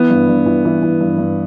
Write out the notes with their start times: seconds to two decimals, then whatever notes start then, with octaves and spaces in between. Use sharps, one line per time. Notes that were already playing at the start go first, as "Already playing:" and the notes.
Already playing: E3 B3
0.10 G2
0.29 G2
0.46 E3
0.65 E3
0.83 E3
1.01 G2
1.18 G2